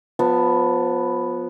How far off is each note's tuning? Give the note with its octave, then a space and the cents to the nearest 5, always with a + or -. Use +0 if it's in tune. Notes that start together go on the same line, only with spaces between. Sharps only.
F3 +30 B3 +0